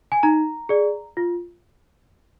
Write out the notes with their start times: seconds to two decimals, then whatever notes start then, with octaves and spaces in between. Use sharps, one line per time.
0.12 G#5
0.23 D#4 A#5
0.69 G#4 D5
1.17 F4